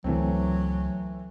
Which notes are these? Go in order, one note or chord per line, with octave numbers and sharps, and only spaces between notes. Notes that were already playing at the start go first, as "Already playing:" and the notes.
C#2 E3 F#3 A3 C4